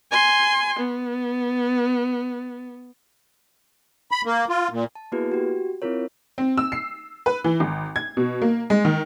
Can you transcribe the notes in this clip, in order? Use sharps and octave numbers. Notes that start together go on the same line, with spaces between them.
G#5 C6
B3
B5
A#3
F4
A#2
A5
A#3 B3 E4 F#4 G#4 B4
F#4 G4
C4 E4 F4 A#4 C#5
C4
E6
C7
B4
E3
G#1
G#6
B2
A#3
G#3
D#3